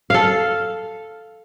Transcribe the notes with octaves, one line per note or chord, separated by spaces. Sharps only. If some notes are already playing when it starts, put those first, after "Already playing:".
A4 F5